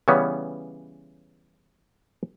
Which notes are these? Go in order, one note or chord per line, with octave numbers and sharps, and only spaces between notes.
C#3 E3 G3 B3 C#4